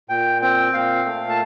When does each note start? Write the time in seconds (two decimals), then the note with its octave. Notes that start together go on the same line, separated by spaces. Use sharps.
0.09 A#2 G5
0.42 C4 G5
0.74 A#2 F5
1.05 A3
1.29 A5